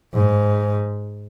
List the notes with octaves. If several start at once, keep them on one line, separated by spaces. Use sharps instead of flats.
G#2